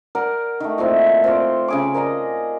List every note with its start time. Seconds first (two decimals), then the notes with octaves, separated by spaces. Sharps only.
0.15 A#4 D5 F#5
0.60 D#3 A3
0.78 A#2 A3 C4 E4
1.24 C4 F4 C5 D5
1.68 C#3 G#4 D6
1.94 A#4 D5 D#5 A#5